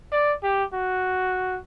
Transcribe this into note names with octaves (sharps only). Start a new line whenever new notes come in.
D5
G4
F#4